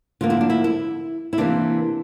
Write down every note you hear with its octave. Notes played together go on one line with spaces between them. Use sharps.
D3 F3 A#3 F4
E4
D4
E4
E4
E4
C3 E3 A#3 D4